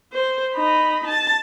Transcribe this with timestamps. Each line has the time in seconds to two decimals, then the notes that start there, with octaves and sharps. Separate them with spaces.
0.12 C5
0.54 D#4 B5
1.07 A5